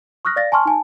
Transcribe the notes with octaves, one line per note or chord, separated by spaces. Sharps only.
C#6 D#6 F6 F#6 A#6
D5 F5 A6 A#6
G#5 A5 C6 C#6 F6
D#4 G#5 A5